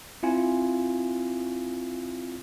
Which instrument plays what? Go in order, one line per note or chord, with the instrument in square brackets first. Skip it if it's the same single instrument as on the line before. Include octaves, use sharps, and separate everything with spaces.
[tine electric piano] C4 E4 F4 G#5